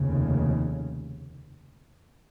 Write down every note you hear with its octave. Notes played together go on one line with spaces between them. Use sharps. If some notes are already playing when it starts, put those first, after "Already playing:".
Already playing: F1 D#2 C#3